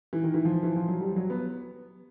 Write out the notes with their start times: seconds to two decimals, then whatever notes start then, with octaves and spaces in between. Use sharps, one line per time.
0.13 E3
0.24 D#3
0.34 E3
0.45 F3
0.63 E3
0.76 F3
0.88 F#3
1.00 G3
1.16 F#3
1.30 B3